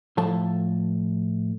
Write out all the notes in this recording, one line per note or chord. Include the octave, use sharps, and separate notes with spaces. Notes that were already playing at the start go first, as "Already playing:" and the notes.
A2 F3 A4 A5